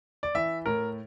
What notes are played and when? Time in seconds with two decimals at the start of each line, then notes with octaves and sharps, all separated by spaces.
0.23 D5
0.35 E3 E5
0.66 A2 A#4